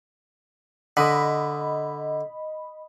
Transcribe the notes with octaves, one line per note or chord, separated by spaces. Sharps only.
D3 D#5 B5